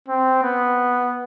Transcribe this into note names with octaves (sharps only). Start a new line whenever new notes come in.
C4
B3